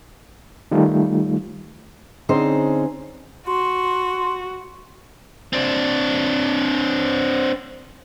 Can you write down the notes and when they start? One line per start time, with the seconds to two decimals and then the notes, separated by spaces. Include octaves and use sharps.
0.71 D#3 G3 A3 D#4 F4
2.29 D3 C4 C#4 D#4 G#4 C5
3.47 F#4 C6
5.53 C4 D4